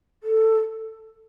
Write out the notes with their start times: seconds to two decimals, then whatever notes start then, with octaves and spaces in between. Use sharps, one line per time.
0.23 A4